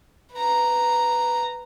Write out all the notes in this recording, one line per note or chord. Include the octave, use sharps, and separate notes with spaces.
B4 A#5